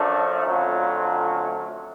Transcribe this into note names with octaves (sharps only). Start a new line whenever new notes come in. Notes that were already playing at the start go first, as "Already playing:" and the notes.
Already playing: F#2 F3 A3 D4
F2 D3 F#3 A3 C#4 F4